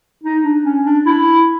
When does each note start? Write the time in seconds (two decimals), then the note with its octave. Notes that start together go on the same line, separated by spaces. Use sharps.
0.24 D#4
0.44 D4
0.65 C#4
0.85 D4
1.05 E4